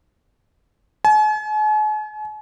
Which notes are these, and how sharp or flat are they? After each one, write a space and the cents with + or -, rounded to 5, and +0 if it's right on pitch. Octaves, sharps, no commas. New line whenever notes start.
G#5 +45